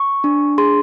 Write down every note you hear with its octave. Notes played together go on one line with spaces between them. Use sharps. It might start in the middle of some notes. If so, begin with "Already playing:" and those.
Already playing: C#6
D4
G#4 C6